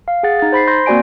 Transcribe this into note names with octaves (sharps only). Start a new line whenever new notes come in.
F5
G#4 F#5 A6
D#4 A6
C5 B5 B6 C7
C6 G6 A#6
A#3 C4 F#4 D5 G#5 D7